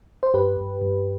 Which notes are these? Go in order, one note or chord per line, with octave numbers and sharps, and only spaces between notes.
C5
G2 G4 B4
G2
G2